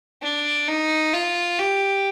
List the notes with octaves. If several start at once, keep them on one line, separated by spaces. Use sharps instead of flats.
D4
D#4
F4
G4